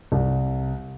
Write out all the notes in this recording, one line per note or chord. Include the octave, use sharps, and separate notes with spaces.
C2